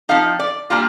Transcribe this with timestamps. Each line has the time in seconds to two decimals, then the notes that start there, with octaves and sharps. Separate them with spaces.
0.09 F3 C4 D#4 F5
0.39 D5
0.70 A#2 G3 A#3 D4 F4